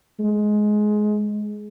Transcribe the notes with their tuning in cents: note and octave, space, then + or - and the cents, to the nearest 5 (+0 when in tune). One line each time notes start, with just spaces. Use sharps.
G#3 +15